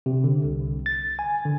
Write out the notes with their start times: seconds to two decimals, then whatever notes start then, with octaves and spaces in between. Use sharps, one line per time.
0.06 C3
0.24 D3
0.45 C2
0.86 A6
1.19 G#5
1.45 D3